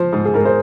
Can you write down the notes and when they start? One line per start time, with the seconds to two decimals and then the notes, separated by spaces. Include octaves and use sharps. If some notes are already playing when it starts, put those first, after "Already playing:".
Already playing: F3 C5
0.13 G#2
0.25 G#4
0.34 G#2 A#4
0.45 C5